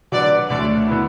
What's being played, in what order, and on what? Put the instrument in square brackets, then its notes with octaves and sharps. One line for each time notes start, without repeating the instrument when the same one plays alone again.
[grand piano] D3 F#3 D4 F#4 B4 [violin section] D5
[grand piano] D2 D3 A3 [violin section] D5
[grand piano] D3 B3 E4